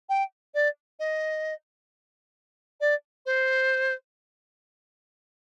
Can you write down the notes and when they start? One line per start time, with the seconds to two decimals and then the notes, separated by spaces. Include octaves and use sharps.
0.09 G5
0.54 D5
0.99 D#5
2.80 D5
3.26 C5